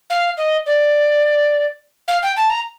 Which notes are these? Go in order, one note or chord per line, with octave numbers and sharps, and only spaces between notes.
F5
D#5
D5
F5
G5
A5
A#5